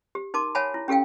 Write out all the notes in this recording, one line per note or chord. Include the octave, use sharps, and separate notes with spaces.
G4
D#4 A#4 A5 C6 D6
C#5 E5 F#5 G#5 A5 B5
E4
C#4 G4 A4 F5 G5